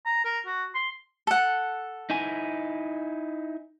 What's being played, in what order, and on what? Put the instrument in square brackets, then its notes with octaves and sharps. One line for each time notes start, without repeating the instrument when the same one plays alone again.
[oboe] A#5
A#4
F#4
C6
[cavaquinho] A4 F#5
[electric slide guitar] D#4 E4 G#5